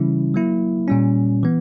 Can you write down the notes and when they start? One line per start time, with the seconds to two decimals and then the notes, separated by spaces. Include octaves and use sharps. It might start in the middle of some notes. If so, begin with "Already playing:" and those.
Already playing: C#3 E3 G3 C#4 E4
0.34 F#3 A#3 E4
0.88 A#2 G3 C#4
1.43 E3 B3